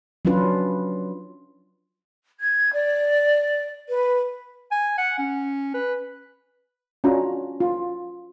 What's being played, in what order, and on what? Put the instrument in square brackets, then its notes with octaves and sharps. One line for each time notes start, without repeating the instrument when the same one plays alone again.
[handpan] F#3 C#4 D4 F4 B4
[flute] G#6
D5
B4
[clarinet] G#5
F#5
C#4
B4
[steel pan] C#4 D4 F4 F#4 A#5
F4